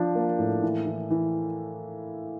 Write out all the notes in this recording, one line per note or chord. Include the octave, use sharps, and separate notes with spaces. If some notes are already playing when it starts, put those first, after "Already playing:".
Already playing: F3 D4
A#3
A2
E3
E3
E3